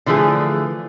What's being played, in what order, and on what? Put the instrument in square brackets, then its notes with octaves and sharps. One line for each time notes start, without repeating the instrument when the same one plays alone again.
[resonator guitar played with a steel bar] D3 E3 F3 A3 G#4